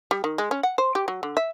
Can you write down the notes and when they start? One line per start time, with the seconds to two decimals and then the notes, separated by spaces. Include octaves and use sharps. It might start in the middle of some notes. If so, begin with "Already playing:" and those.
0.11 G3
0.24 D#3
0.38 G#3
0.51 C#4
0.63 F#5
0.78 C5
0.95 G4
1.08 F#3
1.23 D3
1.37 E5